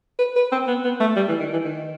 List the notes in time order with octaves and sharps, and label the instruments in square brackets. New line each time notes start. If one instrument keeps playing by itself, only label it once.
[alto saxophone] B4
B4
C4
B3
B3
A3
G3
E3
D#3
E3
D#3